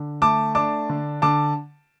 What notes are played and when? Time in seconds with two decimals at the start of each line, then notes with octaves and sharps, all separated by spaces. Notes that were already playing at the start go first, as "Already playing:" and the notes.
Already playing: D3
0.22 A3 A5 D6
0.55 D4 A5 D6
0.89 D3
1.22 D3 A5 D6